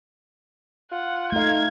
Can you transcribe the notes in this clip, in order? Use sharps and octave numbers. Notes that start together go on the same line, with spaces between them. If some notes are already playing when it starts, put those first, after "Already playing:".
F4 F#5
A3 D#4 F5 G#6